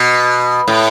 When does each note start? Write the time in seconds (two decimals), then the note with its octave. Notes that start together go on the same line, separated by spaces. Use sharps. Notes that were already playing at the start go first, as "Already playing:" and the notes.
Already playing: B2
0.68 A2